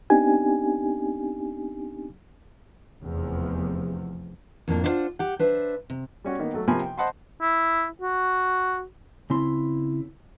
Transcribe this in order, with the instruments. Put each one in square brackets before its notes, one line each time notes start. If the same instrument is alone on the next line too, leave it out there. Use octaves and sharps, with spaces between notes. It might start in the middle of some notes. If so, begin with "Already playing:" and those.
[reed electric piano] B3 C4 D4 D#4 G4 G#5
[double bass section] F1 E2 F3
[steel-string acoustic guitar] F2 A2 A#3 D4
D4 E4 F4 B4 C5 F#5
G4 F#5
D4 B4 C5 E5
C3
[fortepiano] G3 C#4 F#4
D#3 A#3 B3 D#4
F#3 A3
C3 F3 A#3 G#5 B5
G5
C5 D#5 F#5 A5 B5 C6
[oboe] E4
F#4
[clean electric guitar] C#3 C4 E4 C6